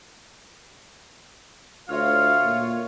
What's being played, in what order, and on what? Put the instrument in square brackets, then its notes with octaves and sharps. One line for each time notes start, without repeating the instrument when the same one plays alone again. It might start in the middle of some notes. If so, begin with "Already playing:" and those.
[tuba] D2 [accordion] F4 C#5 [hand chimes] E5 F6 [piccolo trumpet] F5
[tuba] A#2